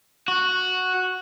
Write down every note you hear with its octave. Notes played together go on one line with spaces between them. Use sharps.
F#4